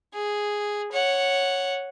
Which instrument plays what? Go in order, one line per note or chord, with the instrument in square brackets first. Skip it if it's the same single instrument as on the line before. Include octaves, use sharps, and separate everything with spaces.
[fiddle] G#4
C#5 F#5